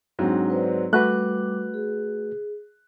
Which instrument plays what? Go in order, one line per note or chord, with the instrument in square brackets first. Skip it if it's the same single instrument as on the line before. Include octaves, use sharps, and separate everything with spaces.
[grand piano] G#2 F#3 C4 [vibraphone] D4
[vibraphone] B4 C5 D5
[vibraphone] G3 D6 [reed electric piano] A3 F#4 B4 [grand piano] F#6
[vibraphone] G#4